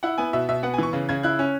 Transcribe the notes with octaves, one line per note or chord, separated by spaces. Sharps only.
E4 F#5
B3 G#5
B2 E5
B2 E5
B3 F#5
G#5
E3 C#6
C#3
C#3 G#6
E4 F#6
C#4